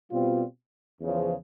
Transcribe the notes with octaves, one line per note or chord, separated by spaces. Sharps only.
B2 G3 C4 F4
E2 C#3 F3